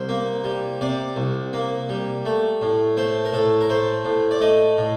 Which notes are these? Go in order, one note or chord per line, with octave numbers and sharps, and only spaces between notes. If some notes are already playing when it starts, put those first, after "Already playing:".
Already playing: C2 C5
A#3
G3
C3 D5
C2
A#3
G3
A3
A2
A3 C5
A#4
A2 A4
A#4
A3 C5
A2
D5
A3 D#5
A2